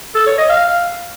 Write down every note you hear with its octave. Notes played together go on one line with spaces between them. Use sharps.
A4
C#5
D#5
F5